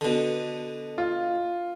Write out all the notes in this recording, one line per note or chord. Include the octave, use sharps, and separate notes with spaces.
B2 D3
F4